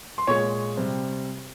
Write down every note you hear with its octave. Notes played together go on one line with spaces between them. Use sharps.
C6
A#2 G#3 C#5 C#6
C3 G3